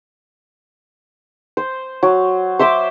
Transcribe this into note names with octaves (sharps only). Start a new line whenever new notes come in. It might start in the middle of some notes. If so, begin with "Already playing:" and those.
C5
F#3
C5 E5 C6 D6